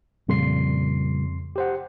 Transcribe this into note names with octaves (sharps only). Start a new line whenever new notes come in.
F2 A#2 C#3 G3 C6 C7
G4 C5 F#5